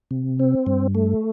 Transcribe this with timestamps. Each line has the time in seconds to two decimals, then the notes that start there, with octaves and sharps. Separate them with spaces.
0.11 C3
0.39 C4
0.66 G2
0.95 A3